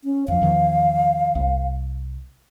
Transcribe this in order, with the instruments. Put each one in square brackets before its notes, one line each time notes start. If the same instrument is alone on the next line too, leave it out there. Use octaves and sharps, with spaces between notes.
[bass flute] C#4
[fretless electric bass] F2 F3 [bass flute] F5
[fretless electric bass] E2 D#3 F3
C2